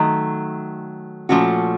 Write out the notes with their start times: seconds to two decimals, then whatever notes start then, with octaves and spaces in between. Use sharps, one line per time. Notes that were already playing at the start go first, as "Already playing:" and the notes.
Already playing: D#3 F#3 A3
1.29 A#2 F3 A3 C#4 F#4